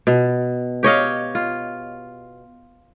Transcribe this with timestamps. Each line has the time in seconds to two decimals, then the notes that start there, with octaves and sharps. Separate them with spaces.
0.07 B2
0.83 G4 C#5 D#5 F5
1.35 F4